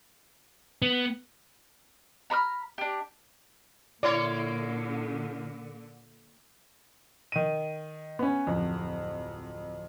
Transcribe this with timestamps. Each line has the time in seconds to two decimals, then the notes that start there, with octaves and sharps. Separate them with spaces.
0.82 B3
2.30 A#5 B5 D6 F6
2.78 D4 G4
4.03 A#2 D3 A#3 E4 C#5 D5
7.32 D#3 D#7
8.19 B3 C#4
8.47 D1 F2